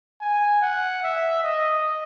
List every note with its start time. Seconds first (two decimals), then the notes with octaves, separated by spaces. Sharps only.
0.21 G#5
0.61 F#5
1.03 E5
1.43 D#5